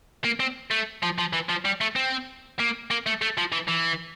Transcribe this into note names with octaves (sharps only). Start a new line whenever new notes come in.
A#3
C4
A3
F3
F3
E3
F3
G3
A3
C4
A#3
A#3
A3
A3
F3
E3
E3